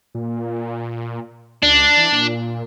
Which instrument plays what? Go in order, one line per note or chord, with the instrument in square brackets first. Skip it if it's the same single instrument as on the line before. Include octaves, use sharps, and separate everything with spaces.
[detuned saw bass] A#2
[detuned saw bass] C#2 [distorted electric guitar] D4
[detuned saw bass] E3
A#2